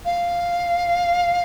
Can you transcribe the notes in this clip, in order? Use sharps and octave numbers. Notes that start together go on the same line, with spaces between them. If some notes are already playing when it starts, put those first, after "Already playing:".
F5